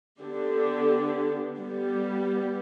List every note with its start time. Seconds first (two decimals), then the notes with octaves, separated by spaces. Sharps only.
0.21 D3 B3 D4 G4
1.58 G3 B3 G4